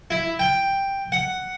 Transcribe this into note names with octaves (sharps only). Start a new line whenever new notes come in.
E4
G5
F#5